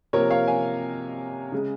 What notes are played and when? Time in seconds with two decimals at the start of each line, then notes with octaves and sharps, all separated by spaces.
0.13 C3 F3 A#3 A#4 C#5
0.30 C#5 F5
0.48 F5 G#5
1.52 C#3 G#3